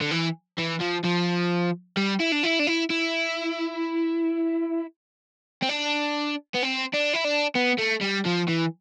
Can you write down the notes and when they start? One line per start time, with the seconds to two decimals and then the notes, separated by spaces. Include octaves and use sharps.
0.01 D3
0.11 E3
0.58 E3
0.80 F3
1.04 F3
1.97 G3
2.20 E4
2.32 D4
2.43 E4
2.59 D4
2.67 E4
2.90 E4
5.62 C4
5.69 D4
6.54 B3
6.62 C4
6.93 D4
7.13 E4
7.24 D4
7.55 B3
7.79 A3
8.02 G3
8.26 F3
8.48 E3